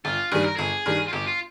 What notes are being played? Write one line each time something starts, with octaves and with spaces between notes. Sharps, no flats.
G1 F4
G2 D#3 G3 G#4
A#4
G1 G#4
G2 D#3 G3
F4
G1 G4
F4